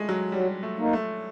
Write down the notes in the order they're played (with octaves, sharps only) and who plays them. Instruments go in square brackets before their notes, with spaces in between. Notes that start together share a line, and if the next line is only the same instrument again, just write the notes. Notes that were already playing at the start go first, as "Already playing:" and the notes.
Already playing: [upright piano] G#3 A3
F#3
[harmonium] F#3 [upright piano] G3
[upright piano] A3
[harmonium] A#3 D#4
[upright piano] A3